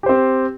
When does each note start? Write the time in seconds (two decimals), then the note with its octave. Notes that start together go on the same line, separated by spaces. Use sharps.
0.03 G4
0.06 C5
0.09 C4